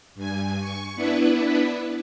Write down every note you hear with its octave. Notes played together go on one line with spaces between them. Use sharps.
G2 G#5
C#6
B3 D4 E4 B4